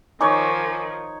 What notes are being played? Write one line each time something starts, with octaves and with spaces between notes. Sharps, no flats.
D#3 F3 D#4 C#5 G#5 C#6 D6